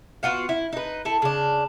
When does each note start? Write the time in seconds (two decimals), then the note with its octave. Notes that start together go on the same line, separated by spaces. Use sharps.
0.23 B3 F4 F#4 F5
0.49 E4
0.73 D#4 B4
1.05 E4 A4
1.22 C#3 D4